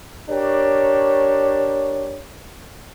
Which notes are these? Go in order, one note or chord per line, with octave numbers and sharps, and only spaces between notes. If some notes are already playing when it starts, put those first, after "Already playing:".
D4 G4 A#4 C#5